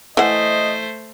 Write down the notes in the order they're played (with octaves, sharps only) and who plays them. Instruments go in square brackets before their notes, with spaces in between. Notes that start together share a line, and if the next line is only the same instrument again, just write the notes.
[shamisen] E3 F#5 [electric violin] A3 C5 [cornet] D#5